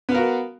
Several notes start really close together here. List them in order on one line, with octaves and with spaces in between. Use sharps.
B3 F5 A#4 F#4